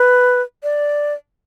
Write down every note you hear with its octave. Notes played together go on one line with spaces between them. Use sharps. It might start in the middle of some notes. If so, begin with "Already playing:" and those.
Already playing: B4
D5